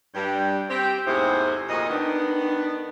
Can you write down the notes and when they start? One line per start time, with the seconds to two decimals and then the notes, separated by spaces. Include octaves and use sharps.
0.15 G2 G3
0.69 C4 G4
1.05 E2 G#2 C3 A3 G#4 C5
1.68 F2 A#2 C4 F#4 D#5
1.89 D#3 B3 D4